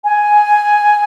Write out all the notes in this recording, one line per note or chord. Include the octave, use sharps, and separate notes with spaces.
G#5